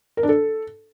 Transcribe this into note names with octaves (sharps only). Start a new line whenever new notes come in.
A#4
D4
A4